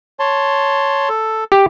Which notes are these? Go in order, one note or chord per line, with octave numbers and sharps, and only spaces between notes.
C#5 A5 C6
A4
G4